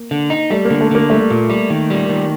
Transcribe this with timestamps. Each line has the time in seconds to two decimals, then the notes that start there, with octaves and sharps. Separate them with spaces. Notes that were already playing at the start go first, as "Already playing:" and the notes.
Already playing: A#3
0.11 D3
0.30 D#4
0.50 G3 A3
0.65 A#3
0.70 D3
0.81 A3
0.91 D3 A#3
1.10 G3 A3
1.30 A#2
1.50 G3
1.70 D#3
1.90 G3
2.10 D#3